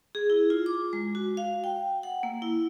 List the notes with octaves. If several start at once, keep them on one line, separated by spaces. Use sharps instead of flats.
G#4
E4
F4
D6
G#3
F#4
F5
G5
F#5
A#3
E4